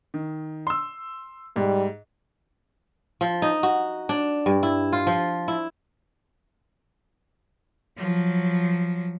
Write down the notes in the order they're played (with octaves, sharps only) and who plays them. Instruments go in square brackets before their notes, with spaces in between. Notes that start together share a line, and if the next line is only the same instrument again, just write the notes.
[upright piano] D#3
C6 E6
[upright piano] G#2 [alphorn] G3
[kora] F3
D#4
F#4
D4
G2
E4
F4
F3
E4
[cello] F3 F#3